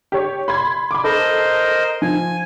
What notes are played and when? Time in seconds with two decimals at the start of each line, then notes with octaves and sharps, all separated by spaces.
0.12 G4 C#5
0.48 B5 C6 G#6
0.91 B5 D6
1.04 A4 A#4 C5 D#5
2.02 F3 G#5